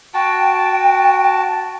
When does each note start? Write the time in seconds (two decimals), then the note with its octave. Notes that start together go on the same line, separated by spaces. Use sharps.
0.14 F#4 G5 A5